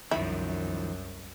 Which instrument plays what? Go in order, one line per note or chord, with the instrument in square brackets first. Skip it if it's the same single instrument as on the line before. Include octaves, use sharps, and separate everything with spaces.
[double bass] C2 F#2 [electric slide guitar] D#3 F3 [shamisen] E4